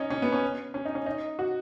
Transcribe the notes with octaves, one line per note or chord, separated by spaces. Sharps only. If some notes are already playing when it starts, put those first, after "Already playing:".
Already playing: C#4 D#4
C#4
B3
C#4
C#4
D#4
C#4
D#4
F#4